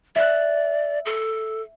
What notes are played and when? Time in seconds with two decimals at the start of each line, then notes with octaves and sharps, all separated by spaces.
0.16 D5 E5 F#6
1.05 A4